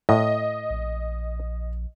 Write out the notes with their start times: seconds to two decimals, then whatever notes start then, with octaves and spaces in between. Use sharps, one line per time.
0.09 A2 D#5
0.70 A#1